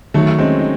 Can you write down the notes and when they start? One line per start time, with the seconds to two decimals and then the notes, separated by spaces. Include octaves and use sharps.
0.14 D#3 F#3 A3
0.38 G#3 C4 C#4
0.59 D#4